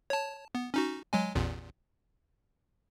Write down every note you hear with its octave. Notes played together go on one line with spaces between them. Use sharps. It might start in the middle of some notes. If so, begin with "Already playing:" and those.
C#5 A5
B3
C#4 D#4 F#4
F#3 G#3 G#5
A1 E2 A#2